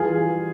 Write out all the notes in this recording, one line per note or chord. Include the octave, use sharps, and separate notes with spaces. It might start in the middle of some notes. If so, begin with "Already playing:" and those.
Already playing: E3 G3 F4 G#4